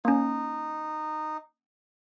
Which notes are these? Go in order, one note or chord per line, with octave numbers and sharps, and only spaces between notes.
A#3 C#4 D#4